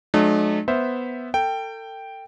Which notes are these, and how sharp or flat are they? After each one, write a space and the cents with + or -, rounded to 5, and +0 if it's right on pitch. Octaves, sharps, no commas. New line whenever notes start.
F#3 -35 A3 -45 D4 +45
B3 +0 C5 +0 E5 +0
A4 +35 G5 +0